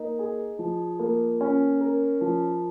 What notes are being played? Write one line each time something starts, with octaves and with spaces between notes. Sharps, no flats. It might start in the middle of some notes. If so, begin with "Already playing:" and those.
Already playing: A#3 D#4
G#4
F3
A#3
C#4
A#4
F3